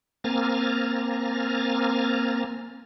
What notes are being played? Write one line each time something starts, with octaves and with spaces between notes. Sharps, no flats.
A#3 C4 G#5 A#5 F6 A6